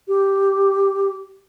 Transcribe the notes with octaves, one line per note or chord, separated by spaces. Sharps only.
G4